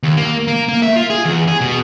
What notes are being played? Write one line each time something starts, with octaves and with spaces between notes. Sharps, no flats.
D#2
A#3
A#3
A#3
E5
F4
G#4
E2
G#4
B2